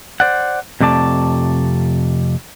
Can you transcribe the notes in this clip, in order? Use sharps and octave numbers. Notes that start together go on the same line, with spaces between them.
C5 D5 F#5
F2 C3 A3 D5 A5